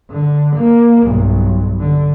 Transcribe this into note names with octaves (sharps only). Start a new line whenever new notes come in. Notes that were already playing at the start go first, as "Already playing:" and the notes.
D3
A#3
B1 G2
D3